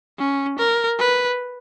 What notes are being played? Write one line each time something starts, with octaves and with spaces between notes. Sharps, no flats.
C#4
A#4
B4